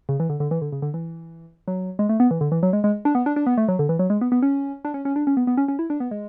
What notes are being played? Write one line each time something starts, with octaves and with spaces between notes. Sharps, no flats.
C#3
E3
D3
D3
E3
D3
C#3
D3
E3
F#3
G#3
A3
B3
E3
D3
E3
F#3
G#3
G#3
D4
B3
D4
D4
B3
A3
F#3
D3
E3
F#3
G#3
B3
B3
C#4
D4
C#4
C#4
D4
C#4
B3
B3
C#4
C#4
E4
D4
B3
G#3